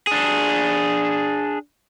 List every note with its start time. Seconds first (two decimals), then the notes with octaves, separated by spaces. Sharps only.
0.07 D4 G#4